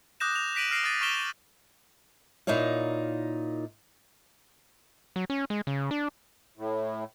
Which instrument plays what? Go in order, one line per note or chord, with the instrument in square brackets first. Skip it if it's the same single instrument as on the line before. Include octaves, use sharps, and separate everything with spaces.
[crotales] D6 D#6 F#6 G6 A#6 E7
F7
A#6 B6 D7 D#7 F#7
F6 A#6 C7 D7
D#6 F#6 A6 D#7
C#6 F6 B6 D7 E7 G7
[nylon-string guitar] A#2 D#4 E4 C#5 F5
[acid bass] F#3
C#4
G#3
C#3
D4
[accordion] A2